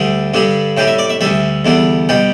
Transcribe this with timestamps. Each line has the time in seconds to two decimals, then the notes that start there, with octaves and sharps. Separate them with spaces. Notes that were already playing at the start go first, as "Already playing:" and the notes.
Already playing: D2 D3 G3
0.34 G2 D3 G3
0.77 A2 G3 G5
0.87 E5
0.99 D5
1.10 E5
1.21 D2 D3 G3 E5
1.65 E2 D3 G3
2.09 B2 G3 G5